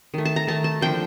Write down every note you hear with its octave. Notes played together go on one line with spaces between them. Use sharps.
D#3 A3
A5
A#5
D#3 A3 A5
A5
D3 F3 A#3 G5